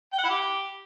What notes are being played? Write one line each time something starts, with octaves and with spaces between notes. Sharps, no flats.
G5
F#5
E4
G4